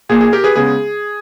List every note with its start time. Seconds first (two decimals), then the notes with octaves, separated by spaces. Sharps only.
0.09 A#2 A#3 G#4
0.21 G#4
0.33 G4 A#4
0.44 G#4 B4
0.56 C#3 G#3 B3 G#4